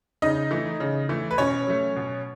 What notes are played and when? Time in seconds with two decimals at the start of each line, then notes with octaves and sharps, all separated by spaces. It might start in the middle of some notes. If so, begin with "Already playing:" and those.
0.22 C#3 D#4 D#5
0.51 E3 A3
0.80 C#3
1.09 E3 A3
1.31 B4
1.38 B2 C#4 C#5
1.67 F#3 A3
1.96 B2